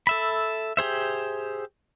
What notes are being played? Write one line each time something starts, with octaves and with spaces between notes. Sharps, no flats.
A4 E5 B5
G4 G#4 C5 E5